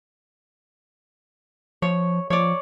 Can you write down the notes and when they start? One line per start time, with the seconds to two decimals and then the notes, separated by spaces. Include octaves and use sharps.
1.82 F3 C#5
2.30 F3 C#5 D5